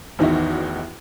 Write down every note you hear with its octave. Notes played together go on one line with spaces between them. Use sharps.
A1 E2 D#3 D#4 F#4 E5